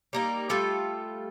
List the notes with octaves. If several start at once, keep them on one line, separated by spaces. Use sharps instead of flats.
G3 A#3 D#4
G3 A3 F4 A4